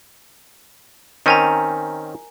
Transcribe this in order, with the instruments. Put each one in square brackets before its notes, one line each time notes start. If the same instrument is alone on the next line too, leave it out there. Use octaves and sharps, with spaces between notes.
[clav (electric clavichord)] D#3 C4 C#4 [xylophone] A#4 G#5 A#5